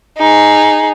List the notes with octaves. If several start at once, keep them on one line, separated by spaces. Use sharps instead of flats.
D#4 G#4